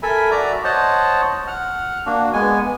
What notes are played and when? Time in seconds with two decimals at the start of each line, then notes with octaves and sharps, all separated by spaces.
0.03 A4 A#4 E5 G#5 B5
0.31 F#4 D5 E5 A#5
0.64 C5 C#5 D#5 F#5 A5
1.47 F#5 F6
2.06 A#3 D4 F#4
2.33 G#3 B3 G#5